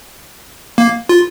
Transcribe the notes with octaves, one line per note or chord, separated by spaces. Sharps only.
A#3
F4